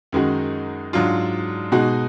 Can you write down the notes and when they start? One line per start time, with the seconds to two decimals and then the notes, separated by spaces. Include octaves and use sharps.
0.12 F#2 D#3 G#3 D#4 F#4
0.93 G#2 F#3 D4 F4
1.72 B2 G#3 D#4 F#4